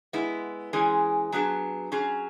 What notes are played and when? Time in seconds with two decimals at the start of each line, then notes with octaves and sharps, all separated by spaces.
0.13 G#3 B3 E4
0.73 E3 G#3 C#4 G#4
1.32 F#3 B3 D4 G#4
1.92 F#3 C#4 G#4